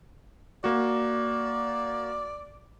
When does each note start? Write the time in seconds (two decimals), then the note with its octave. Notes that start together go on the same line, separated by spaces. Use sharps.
0.64 A#3 F#4 D5